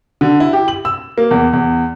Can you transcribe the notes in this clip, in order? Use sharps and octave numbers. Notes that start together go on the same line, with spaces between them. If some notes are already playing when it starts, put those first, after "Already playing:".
D3
E4
G4
F#7
E6
A#3
E2
E2